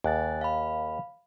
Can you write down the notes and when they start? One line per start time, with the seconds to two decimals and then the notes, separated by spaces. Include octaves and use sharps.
0.04 D#2 G#5 F#6 A6
0.41 F5 B5